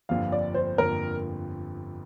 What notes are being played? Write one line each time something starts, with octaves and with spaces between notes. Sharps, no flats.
G1 F2 D3 F3 A#3 F5
D5
C5
G1 F2 D3 F3 A#3 A#4